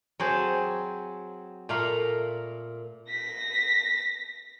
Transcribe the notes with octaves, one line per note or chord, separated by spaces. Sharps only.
F#3 C4 F#4 G#4 G5 A5
A#2 A3 A#4 F5 A#5 B5
A#6 B6